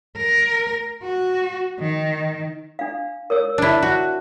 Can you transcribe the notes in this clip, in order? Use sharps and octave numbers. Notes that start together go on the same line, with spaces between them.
A#4
F#4
D#3
D4 F5
A#4 C#5 E6
D4 E4
F#4